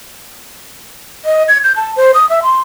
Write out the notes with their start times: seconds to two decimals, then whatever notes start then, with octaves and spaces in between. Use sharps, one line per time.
1.25 D#5
1.48 G#6
1.64 G6
1.76 A5
1.96 C5
2.14 D#6
2.30 E5
2.43 C6